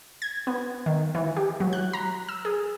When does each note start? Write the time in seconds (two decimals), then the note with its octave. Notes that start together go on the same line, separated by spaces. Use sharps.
0.22 G#6
0.47 B3
0.86 D#3
1.15 E3
1.36 G4
1.60 F#3
1.73 F#6
1.93 A#5
2.29 E6
2.45 G#4